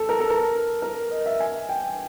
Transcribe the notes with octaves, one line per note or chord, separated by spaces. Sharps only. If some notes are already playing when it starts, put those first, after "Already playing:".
Already playing: A4
A#4
A4
A#4
A#4
D#5
E5
G#5
G5